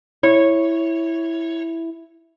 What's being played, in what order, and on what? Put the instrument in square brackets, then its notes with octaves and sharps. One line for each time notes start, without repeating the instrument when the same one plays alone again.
[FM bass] E4 [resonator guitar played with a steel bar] C#5